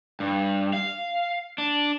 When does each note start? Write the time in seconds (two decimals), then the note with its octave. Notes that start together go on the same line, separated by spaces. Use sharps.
0.20 G2
0.73 F5
1.58 D4